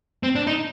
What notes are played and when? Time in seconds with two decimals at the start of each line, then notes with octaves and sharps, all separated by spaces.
0.23 C4
0.35 D4
0.47 D#4